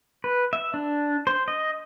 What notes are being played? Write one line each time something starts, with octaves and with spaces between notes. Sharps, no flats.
B4
E5
D4
C5
D#5